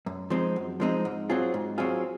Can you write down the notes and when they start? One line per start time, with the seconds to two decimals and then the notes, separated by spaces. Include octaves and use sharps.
0.06 F#2
0.30 F3 G#3 C4 D#4
0.56 F#2
0.80 F3 G#3 C4 D#4
1.05 G#2
1.30 F#3 C4 F4 G#4
1.54 G#2
1.78 F#3 C4 F4 G#4